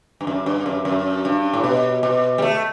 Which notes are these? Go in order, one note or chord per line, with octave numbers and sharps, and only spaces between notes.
G2
F#2
G2
F#2
F#2
G2
A2
B2
B2
G3
A3